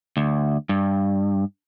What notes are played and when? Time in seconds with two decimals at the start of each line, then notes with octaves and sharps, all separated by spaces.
0.17 D2
0.69 G2